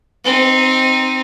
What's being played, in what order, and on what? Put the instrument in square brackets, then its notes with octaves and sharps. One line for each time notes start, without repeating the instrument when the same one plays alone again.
[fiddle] C4 D#4